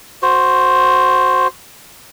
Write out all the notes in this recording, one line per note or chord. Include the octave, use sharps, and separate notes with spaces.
F#4 C5